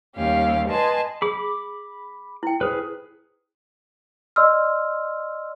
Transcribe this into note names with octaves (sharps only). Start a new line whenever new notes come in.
D#2 G3 C#4 G4 F5
B4 D#5 G#5 A5 C6
G#4 B5 D6
E4 G5
G#4 B4 C5
D5 D#5 C6 E6 F6